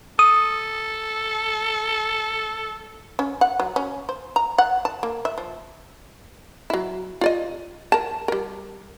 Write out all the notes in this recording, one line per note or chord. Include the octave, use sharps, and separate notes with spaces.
A4 D#6
C#4
F#5
F#3
C#4
C5
A#5
F#5
A5
A#3
E5
F3
F#3 E4
F4 D5 D#5
A#4 A5
G3 A#4